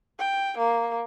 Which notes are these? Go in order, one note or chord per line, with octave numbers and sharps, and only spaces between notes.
G5
A#3